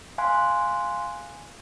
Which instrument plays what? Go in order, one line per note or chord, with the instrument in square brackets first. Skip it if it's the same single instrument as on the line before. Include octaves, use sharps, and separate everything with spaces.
[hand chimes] F5 G#5 C6 F#6